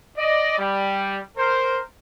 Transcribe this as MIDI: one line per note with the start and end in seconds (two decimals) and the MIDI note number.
0.18 0.56 74
0.18 0.56 75
0.58 1.20 55
1.37 1.79 70
1.37 1.79 72